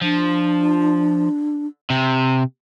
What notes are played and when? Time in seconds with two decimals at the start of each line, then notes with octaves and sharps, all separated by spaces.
0.01 F3 D4
1.90 C3